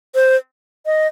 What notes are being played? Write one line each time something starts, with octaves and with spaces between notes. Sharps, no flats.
C5
D#5